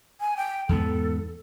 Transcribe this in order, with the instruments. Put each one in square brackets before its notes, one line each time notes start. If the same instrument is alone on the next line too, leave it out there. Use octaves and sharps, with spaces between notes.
[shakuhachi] G#5
G5
[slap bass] E2 G#2 B3 [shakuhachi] A4